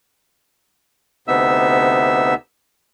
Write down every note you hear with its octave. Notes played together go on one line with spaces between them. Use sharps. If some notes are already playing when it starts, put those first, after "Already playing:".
D2 C3 B3 D#4 E5 E6